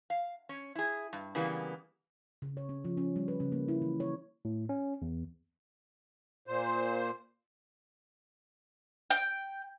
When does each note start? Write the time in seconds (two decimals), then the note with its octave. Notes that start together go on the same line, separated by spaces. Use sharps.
0.10 F5
0.49 C#4
0.75 E4 G#4
1.13 G2
1.35 C#3 E3 G3 A#3 B3
2.42 C#3
2.57 C#5
2.69 C#4
2.85 F3
2.97 C#4
3.16 G3
3.28 B4
3.40 C#3
3.52 A#3
3.68 E4
3.82 E3
4.00 C#5
4.45 A2
4.69 C#4
5.02 E2
6.47 A#2 C5
9.10 G5